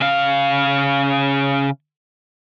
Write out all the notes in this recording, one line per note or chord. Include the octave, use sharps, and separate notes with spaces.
C#3 F5